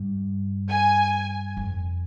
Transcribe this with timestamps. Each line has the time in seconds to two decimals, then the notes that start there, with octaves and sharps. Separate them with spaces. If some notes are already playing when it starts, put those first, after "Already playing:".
Already playing: G2
0.69 G#5
1.57 F2